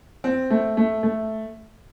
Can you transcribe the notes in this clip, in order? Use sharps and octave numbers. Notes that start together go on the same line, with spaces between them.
C4
A3
A3
A3